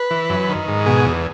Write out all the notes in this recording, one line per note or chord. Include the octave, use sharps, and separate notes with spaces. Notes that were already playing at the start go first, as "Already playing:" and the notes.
Already playing: B4
E3
F#2
D#3
G#2
B2 G#4
E2